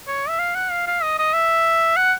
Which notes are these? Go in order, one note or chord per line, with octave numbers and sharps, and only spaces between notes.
C#5
E5
F5
F#5
F5
F5
D#5
D#5
E5
F#5